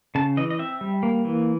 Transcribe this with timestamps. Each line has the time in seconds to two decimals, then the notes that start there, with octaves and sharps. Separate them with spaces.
0.15 C#3 A5
0.37 E3 D#5
0.50 D#5
0.59 C4 E5
0.81 G3
1.03 A#3
1.25 E3